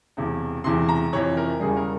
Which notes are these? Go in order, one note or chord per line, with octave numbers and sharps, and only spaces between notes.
E1 E2 C3
E1 E2 C3 E3 C6
A#5
F2 C3 E3 C#5
A#4
E1 E2 C#3 G3 G#4
A#4